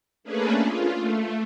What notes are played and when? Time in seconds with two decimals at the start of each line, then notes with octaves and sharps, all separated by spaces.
0.24 A3 A#3 C#4 D4 G#4 B4
0.60 F4
0.94 A3